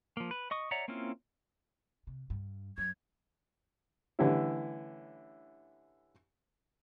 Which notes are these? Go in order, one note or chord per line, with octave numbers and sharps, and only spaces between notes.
F3 A#3
B4
D#5 C#6 D#6
C#5 D5 E5 F#5 A#5
A#3 C4 C#4 E4 F4
C3
G2
F#2 G#6
D3 E3 G3 A3 C#4 E4